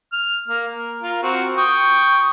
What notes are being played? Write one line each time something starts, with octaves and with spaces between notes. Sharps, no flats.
F6
A#3
A#4
F4 A#4
C4 F#4
G5 C#6 D#6